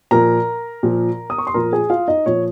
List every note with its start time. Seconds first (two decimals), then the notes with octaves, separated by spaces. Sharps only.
0.11 A#2 F3 A#4 A#5
0.83 A#2 F3
1.30 D#6
1.38 C#6
1.47 C6
1.54 A#2 F3 A#4 A#5
1.72 G#4 G#5
1.90 F4 F5
2.08 D#4 D#5
2.26 A#2 F3 C#5